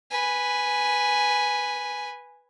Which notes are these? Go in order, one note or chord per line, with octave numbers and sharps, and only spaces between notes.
B4 G#5